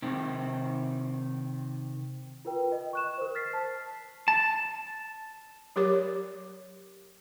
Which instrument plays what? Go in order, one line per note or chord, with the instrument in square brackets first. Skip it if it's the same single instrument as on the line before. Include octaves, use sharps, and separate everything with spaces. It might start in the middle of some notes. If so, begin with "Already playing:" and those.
[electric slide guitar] C3 D#3 C4
[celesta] F4 A#4 B4 G5
D#5
C#6 F#6 E7
A#4 C5
F6 A6 B6 C7
A5
[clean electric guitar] A5
[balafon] F#3 G4 A#4 C#5 D6